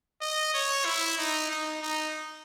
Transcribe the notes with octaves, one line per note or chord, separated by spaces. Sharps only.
D#5
C#5
E4
D#4
D#4
D#4